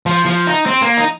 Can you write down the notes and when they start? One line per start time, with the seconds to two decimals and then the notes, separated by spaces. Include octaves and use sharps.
0.06 F3
0.26 F3
0.47 D#4
0.66 C4
0.82 A#3
0.97 D#4